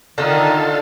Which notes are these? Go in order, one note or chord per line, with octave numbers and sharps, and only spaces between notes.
D3 D#3 D#4 F4 A4